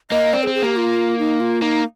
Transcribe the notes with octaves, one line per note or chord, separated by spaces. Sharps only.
A#3 D#5
C4 D5
G#4
C4
G#4
A#3 G4
F4
D#4
F4
A#3 D#4